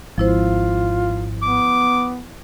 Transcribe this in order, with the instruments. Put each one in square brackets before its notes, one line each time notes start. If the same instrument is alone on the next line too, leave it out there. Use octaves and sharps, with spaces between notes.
[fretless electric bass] G#1 [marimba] F3 E4 C5 [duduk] F4
[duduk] B3 [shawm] D6